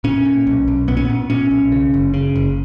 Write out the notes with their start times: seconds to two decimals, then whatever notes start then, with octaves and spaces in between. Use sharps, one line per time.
0.04 A#2 C#4
0.25 A#2
0.47 B1
0.68 B1
0.88 A#2 B3
0.97 C#4
1.05 A#2 B3
1.30 A#2 C#4
1.51 B1
1.72 C#3
1.94 F#1
2.14 C#3
2.35 F#1